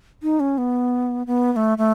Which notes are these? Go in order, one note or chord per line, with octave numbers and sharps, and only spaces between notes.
D#4
C#4
B3
B3
B3
A3
A3